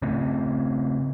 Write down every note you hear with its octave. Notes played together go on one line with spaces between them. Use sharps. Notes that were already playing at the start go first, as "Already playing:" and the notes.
C#3 A3 C4 C#4